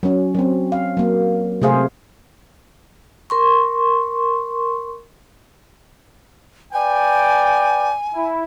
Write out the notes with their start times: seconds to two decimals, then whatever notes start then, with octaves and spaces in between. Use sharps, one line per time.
0.03 F#3 C#4
0.35 F#3 C4
0.72 F5
0.97 F#3 A#3
1.62 C3 A3 G#4 C5 F5
3.30 A#4 C6 C#6
6.73 B4 D5 G5 G#5
8.13 E4